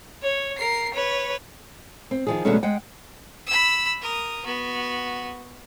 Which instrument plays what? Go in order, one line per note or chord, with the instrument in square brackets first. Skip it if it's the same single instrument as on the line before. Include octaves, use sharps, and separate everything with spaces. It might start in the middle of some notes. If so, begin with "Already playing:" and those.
[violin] C#5
A#4 C7
B4 C#5
[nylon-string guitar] C4
D#3 F3 G#4
B2 D3 F#3 G#3 A3 C#4
G#3 F#5 G5
[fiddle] B5 E6
A#4 D#6
B3 F#4